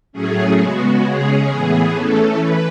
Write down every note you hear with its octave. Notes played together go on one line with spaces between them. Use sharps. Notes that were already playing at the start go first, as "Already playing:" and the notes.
A2 F#3 A3 C#4 G#4
C#3 G#3 B3 F#4
C#3 G#3 C#4 G#4
A2 E3 B3 G#4
E3 A3 C#4 A4
E3 B4